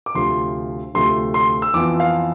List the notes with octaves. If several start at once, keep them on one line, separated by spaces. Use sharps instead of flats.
D6
D2 C3 F3 A3 C6
D2 C3 F3 A3 C6
C6
E6
F2 E3 B3 F4 D6
F5